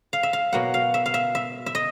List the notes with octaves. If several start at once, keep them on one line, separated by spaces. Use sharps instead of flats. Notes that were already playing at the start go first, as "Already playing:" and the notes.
F5
E5
F5
B2 F#3 A#3 F#5
F5
E5
F5
E5
E5
E5
D#5